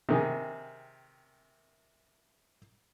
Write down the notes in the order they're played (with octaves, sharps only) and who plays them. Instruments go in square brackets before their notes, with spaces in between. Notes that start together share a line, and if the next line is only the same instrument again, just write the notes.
[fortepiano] C3 D#3 G#4